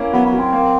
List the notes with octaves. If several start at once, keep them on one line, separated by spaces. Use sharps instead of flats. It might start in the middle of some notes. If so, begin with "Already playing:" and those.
Already playing: A#3 C#4 E4
F#3 B3
B3
F#3
C4
A#3